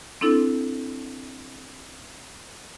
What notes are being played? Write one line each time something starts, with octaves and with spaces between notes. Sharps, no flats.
C4 D4 E4 A4